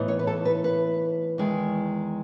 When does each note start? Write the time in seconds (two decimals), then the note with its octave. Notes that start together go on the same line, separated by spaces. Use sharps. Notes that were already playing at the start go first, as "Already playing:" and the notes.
Already playing: A2 E3 B3 D#4
0.08 C#5
0.19 B4
0.27 A4
0.45 B4
0.64 B4
1.38 E2 D#3 G#3